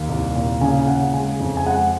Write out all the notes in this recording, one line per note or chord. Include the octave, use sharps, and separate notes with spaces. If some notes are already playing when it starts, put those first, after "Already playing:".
Already playing: D#2
C2
A#2
C#3 G#5
C#3 F#5
G#3 G#5
F2
G#5
G#3 F#5